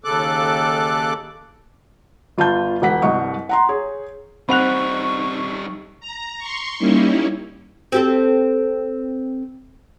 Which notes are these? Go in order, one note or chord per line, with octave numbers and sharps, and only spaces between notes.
D#2 C#3 A4 D6 F#6
G1 F4 F5 A5 G6
E1 F#5 B6
C2 G2 D#5 F#5 C#6
F#5 A#5 C6
G#4 C#5
G3 C4 D#4 F#5 B5 C#6 F#6 F7
A#5
C6 C#6
G3 A#3 C#4 D#4 E4
C4 G4 A4